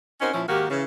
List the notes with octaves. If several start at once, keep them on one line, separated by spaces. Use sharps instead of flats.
C4 C#4 D#4 F#4 A#4 C5
A#2 F3 C#4 E4
G#2 D#3 A#3 F#4 G4
C#3 E3